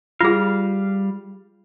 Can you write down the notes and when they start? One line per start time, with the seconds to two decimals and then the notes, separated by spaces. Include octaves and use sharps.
0.21 G3 F4 G#4 F5